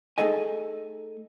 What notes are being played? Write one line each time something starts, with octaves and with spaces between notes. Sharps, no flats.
A3 D#4 G#4 A4 D#5 G#5